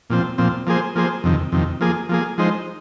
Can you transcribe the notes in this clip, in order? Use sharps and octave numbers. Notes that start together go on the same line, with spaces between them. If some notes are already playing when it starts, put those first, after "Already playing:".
A#2 F3 C4
A#2 F3 C4
F3 A#3 G#4 C5
F3 A#3 G#4 C5
F2 C3 D#3
F2 C3 D#3
F3 A#3 G#4
F3 A#3 G#4
F3 G#3 D#4 C5